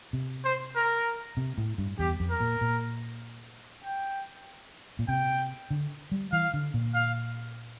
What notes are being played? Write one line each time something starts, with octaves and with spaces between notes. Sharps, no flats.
C3
C5
A#4
C3
A2
G2
E2 G4
F2
A#4
A#2
A#2
G5
A#2
C3 G5
D3
G3
E3 F5
D3
A#2
F5